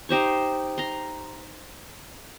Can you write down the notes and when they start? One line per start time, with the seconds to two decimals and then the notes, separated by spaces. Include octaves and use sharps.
0.09 D#4 G4 C5 C#6
0.78 A#5 C6